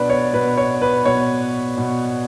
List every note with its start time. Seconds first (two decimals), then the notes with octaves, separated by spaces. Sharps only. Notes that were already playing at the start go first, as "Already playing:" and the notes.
Already playing: B2 D4 B4 D5
0.10 C#5
0.34 B2 B4
0.57 C#5
0.82 B4
1.06 B2 C#5
1.78 B2